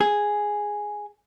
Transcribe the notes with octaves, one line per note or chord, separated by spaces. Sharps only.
G#4